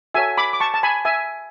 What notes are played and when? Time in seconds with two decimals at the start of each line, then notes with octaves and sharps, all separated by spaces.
0.14 F#4 A4 C#5 E5 G#5
0.38 B5 D6
0.53 D6
0.60 A5 C#6
0.74 A5
0.83 G#5 B5
1.05 E5 G#5